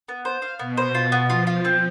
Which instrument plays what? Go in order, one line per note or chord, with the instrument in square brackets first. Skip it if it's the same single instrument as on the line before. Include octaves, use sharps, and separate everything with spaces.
[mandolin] B3
C5
F5
[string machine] B2 [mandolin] B3
[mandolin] C5
F4
B3
[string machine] F3 [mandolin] F4
[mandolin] F4
C4